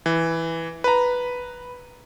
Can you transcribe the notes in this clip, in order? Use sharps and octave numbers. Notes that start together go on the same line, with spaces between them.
E3
B4 A#5